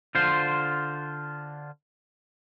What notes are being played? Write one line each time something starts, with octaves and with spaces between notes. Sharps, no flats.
D3 F4 C5